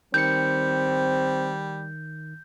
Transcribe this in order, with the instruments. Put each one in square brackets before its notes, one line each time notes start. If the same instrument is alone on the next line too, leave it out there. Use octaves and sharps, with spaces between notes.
[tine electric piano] D#3 C#7 [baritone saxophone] G3 [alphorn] C4 [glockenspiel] G6